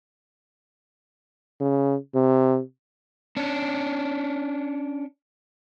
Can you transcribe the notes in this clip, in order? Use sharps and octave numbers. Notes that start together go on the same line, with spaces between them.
C#3
C3
C#4 D4